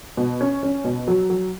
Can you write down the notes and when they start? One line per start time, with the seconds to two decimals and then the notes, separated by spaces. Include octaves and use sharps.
0.17 B2
0.41 C#4
0.63 C#4
0.84 B2
1.08 F#3
1.30 F#3